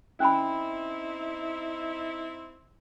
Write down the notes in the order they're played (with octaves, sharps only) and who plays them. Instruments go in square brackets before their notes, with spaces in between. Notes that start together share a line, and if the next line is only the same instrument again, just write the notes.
[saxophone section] C4 D#4 E4 [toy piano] C#4 G#5 B5